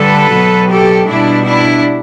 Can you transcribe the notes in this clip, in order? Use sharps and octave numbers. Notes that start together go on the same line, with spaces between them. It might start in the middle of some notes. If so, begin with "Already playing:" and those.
Already playing: D3 G3 A4 B4
B2 F#3
G4 A4
B2 G3 D4 E4
D4 E4